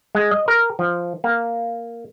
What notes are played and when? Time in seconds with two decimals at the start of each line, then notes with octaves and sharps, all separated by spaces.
0.15 G#3
0.31 D#5
0.48 A#4
0.79 F3
1.24 A#3